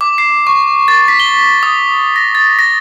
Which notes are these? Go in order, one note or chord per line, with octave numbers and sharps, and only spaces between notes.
D6
C7
C#6
A6
B6
G7
D#6
A#6
A6
A#6